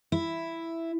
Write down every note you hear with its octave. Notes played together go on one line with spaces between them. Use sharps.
E4